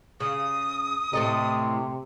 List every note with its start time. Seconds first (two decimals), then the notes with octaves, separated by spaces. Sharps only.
0.20 C#3 D#6
1.13 A2 C3 A4 D#5